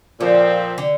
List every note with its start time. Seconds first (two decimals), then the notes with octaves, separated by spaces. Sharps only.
0.20 A#2 D3 F3 C4
0.78 D3